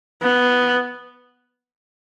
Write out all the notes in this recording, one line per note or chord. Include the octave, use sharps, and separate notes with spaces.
B3